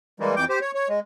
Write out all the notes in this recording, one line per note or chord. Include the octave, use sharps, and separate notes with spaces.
E3 G3 G#3 A#3
F2 E3 G5 D6 G6
G4 C5
C#5
C#5
G#3